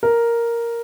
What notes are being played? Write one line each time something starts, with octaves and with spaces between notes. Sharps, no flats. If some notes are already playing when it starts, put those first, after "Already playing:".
A#4